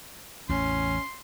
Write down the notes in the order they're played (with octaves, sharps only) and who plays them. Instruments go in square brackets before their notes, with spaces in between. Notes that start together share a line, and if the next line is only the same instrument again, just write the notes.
[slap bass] A1 E2 A2 [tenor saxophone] C#4 [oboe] C6